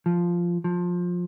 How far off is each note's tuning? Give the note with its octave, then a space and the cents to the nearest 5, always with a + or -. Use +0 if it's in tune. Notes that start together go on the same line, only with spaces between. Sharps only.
F3 -5
F3 +20